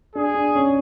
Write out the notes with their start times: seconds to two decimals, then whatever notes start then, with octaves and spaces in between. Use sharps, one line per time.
0.15 D4 G#4
0.35 D4
0.55 C#4